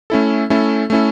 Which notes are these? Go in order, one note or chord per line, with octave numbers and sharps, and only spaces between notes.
A3 C#4 E4 A4
A3 C#4 E4 A4
A3 C#4 E4 A4